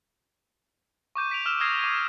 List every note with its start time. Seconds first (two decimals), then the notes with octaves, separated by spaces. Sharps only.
1.15 C#6 D6 G6 D#7
1.31 B6 D7 F7
1.46 E6 F6 E7
1.60 D#6 F6 G#6 A#6 C7
1.80 D6 D#7